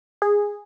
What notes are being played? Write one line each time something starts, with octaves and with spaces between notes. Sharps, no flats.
G#4